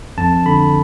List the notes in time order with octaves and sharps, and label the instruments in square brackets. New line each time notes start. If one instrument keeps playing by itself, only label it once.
[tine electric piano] F2 A5
D3 B5